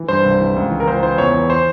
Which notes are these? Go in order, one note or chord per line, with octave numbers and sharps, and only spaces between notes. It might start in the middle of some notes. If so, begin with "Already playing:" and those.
Already playing: E3
G2 C5
C2
E3
C#2
E3
A#4
C#2 C5
E3 C5
E2 C#5
E3
C5